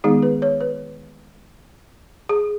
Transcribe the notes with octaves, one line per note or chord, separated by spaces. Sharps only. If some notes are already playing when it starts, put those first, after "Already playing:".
D#3 G#3 B3 D#4 G#4
B4
C#5
B4
G#4